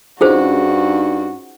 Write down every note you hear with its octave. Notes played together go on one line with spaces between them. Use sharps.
G2 C#4 D#4 F4 F#4 G#4 C5